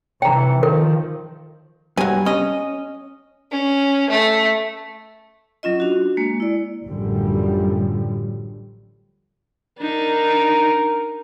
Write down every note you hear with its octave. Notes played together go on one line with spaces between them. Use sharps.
C3 E3 G5 A#5
D#3 F3 A#4
G2 F#3 G#5
C#4 D#5
C#4
A3
F#3 C#4 F4 D#5
D4 F#4
G#3 A#3
E4 D5
A1 F#2 D3 F3 G3
D4 D#4 A#4